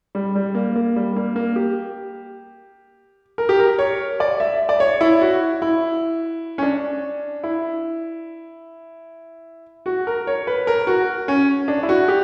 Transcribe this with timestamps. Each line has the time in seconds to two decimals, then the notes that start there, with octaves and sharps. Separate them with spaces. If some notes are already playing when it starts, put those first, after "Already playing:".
0.15 G3
0.35 G3
0.55 A#3
0.76 A#3
0.96 G3
1.16 A#3
1.36 A#3
1.56 G4
3.38 A#4
3.49 G4
3.59 A#4
3.79 C#5
4.20 D5
4.40 E5
4.69 D5
4.80 C#5
5.01 E4
5.21 F#4
5.62 E4
6.58 C#4
6.63 D4
7.44 E4
9.86 F#4
10.07 A#4
10.27 C#5
10.47 B4
10.67 A#4
10.87 F#4
11.28 C#4
11.68 D4
11.83 E4
11.89 F#4
12.08 G4